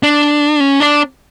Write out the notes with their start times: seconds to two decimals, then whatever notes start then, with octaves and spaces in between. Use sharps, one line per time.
0.03 D4
0.60 C#4
0.80 D4